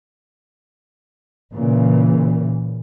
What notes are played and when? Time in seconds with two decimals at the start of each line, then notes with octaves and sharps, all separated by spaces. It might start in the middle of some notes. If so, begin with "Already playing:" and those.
1.54 A#2 C#3 E3